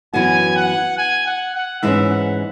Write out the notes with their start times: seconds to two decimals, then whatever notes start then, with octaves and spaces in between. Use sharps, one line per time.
0.13 F#2 E3 B3 F#4 G#5
0.56 F#5
0.98 G#5
1.26 F#5
1.55 F#5
1.82 G#2 E3 G#3 C#4 E5
2.11 F#5